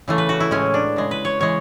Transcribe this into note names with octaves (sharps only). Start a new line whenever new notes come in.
C#3 E3 A3
B4
F#4
E4
A2 G#3 C#4
D4
C#3 G#3
B4
C#5
C#3 E3 G#3 C#5